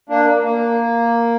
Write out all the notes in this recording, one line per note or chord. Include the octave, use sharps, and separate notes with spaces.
A#3 D4
A#3
A#3